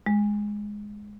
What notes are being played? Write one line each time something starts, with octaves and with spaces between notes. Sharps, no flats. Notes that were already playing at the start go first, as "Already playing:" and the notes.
G#3